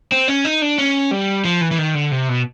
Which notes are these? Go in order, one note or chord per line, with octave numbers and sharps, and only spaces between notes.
C4
C#4
D#4
D4
C#4
G3
F3
E3
E3
D#3
D3
C3
B2